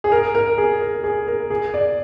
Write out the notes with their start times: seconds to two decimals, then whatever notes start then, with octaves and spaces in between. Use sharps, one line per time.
0.04 G#4
0.12 A#4
0.35 A#4
0.58 G#4
0.81 A#4
1.04 G#4
1.27 A#4
1.50 G#4
1.74 D5